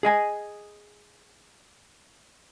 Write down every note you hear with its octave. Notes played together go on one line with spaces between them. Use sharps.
G#4 D#5 G#5